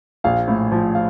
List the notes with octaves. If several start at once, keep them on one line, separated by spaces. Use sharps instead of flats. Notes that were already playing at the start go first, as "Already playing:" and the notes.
A#1 F5
A2
F3
F5